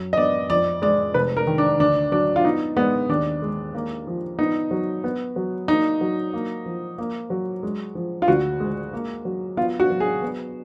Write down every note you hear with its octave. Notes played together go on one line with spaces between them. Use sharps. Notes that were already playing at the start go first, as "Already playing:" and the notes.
Already playing: F#2
D#5
B3 D5
F2 D5
G#3 D5
F1 B4
A#4
D#3
D4
D2 D4
F#3 D4
F4
B3 D#4
G#3 B3
D#2 D4
G#3
A#3
F3
B3 D#4
F#3
B3
F#3
A#3 D#4
F#3
A#3
F3
A#3
F#3
G#3
F3
F4
D2 F#4
G#3
A#3
F#3
B3 F4
F#4
F#3
G#4
B3